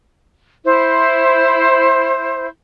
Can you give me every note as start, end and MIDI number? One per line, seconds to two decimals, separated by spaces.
0.65 2.48 64
0.65 2.48 72